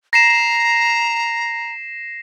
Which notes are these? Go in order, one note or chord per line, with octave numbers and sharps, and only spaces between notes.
A#5 A#6 C7 E7